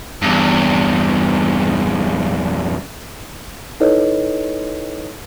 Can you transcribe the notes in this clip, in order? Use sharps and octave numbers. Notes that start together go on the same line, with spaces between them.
E2 G2
D#4 E4 A4 B4 C#5 D#5